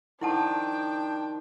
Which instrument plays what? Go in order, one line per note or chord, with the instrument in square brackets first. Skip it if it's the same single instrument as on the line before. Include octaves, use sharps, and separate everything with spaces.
[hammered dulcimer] D#3 F3 [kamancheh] D4 G5 [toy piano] E4 F#5 A5